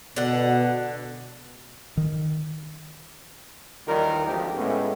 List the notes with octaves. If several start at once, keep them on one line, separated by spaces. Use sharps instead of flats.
B2 D3 F#5
D#3
D#2 D#3 E3 G3 F4 A#4
G#1 D2 F3 D#4 G4
A2 G#3 A3 B3 C#4